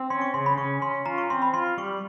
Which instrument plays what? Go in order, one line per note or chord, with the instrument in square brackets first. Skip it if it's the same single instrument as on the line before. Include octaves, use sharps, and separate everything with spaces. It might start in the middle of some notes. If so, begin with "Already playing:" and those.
Already playing: [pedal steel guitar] C4
[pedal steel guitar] C#4 [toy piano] C6
[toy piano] C#6
[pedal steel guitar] C#3 [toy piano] C6
[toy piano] B5
[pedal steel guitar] C#4 [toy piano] C#6
[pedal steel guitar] C#4 [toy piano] C6
[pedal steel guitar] F4 [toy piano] A#5
[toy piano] C#6
[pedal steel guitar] C4 [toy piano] C6
[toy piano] B5
[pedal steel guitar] F4 [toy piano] C6
[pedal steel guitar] G3 [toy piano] C#6